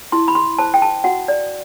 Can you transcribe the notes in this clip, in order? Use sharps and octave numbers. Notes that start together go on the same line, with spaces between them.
E4 C6
B5
C6
C5 A5
G5
A5
F#4 F#5
D5